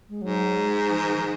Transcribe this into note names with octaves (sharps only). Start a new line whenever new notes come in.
G#3
G#2 F#3
G#3
F3
D#3
F3